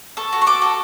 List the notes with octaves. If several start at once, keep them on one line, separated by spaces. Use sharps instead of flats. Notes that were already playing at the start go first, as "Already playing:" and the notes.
A4 C#6
F#4
C#6
A4 D6
F#4